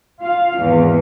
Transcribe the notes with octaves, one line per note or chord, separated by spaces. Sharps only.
F4 F5
G#1 E2